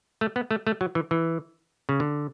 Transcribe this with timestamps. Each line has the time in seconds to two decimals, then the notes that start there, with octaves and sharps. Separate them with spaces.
0.21 A3
0.36 B3
0.51 A3
0.67 A3
0.81 F#3
0.95 E3
1.11 E3
1.89 C#3
2.00 D3